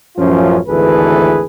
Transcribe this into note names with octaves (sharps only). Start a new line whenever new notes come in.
A1 F#2 F3 C#4 F4
G#1 D2 E3 G#4 A4 B4